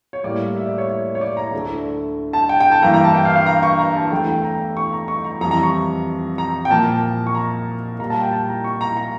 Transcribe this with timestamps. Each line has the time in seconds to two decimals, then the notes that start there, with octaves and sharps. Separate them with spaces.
0.13 C#5
0.24 A2 G3 A#3 D5
0.56 E5
0.66 D5
0.78 C#5
0.89 C#5
1.15 C#5
1.21 D5
1.37 A#5
1.53 D2 D3 A3
2.33 A5
2.49 G5
2.60 G5
2.71 A5
2.82 G2 E3 A#3 A#5
2.94 A#5
3.04 A5
3.14 G5
3.25 F5
3.36 F5
3.46 A#5
3.63 C#6
3.79 A#5
3.96 A5
4.12 E2 E3 A3 G5
4.27 G5
4.43 A#5
4.77 C#6
4.92 A#5
5.08 C#6
5.24 A#5
5.41 F2 E3 G3 A#5
5.51 A#5
5.63 C#6
6.38 A#5
6.65 G5
6.70 A#2 F3 A#3 A5
7.27 C#6
7.35 A#5
7.99 A#2 G3 A#3 A#5
8.10 A5
8.21 G5
8.31 A5
8.49 A#5
8.64 C#6
8.81 A#5
8.97 A#5